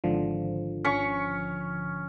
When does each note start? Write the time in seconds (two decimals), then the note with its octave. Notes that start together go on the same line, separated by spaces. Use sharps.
0.04 G#1 D3 F3
0.85 C#4 C#6